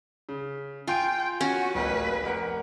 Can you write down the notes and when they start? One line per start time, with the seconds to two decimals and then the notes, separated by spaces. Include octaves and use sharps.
0.29 C#3
0.87 F4 G5 G#5 C6 D7
1.41 C#4 F#4
1.75 D1 A1 A#3 B4
2.23 F1 A#4 F#5